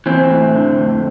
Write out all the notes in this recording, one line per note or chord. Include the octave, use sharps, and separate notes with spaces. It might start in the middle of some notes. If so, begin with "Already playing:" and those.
E3 C4
A2
D3
F2